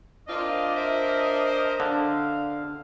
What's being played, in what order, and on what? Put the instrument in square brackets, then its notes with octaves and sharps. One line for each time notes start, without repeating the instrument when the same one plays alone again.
[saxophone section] A#3 C4 F4 [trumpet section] D4 D#5 [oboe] D5
[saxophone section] A#4 C5 [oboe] E5
[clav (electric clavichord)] D3 [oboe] F5